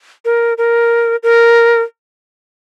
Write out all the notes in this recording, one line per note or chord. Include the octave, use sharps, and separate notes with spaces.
A#4
A#4
A#4